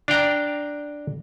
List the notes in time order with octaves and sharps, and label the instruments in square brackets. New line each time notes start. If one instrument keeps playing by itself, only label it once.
[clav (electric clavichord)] D4 F5 G5 A#5